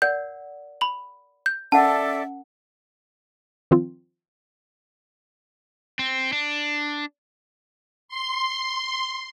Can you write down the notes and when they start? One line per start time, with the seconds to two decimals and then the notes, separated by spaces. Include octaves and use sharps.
0.02 A#4 D5 F#5 G6
0.81 B5 F#7
1.46 G6
1.72 C#4 A4 A#4 D5 E5 F#5 A5
3.71 D#3 F3 C4 F4
5.99 C4
6.33 D4
8.08 C6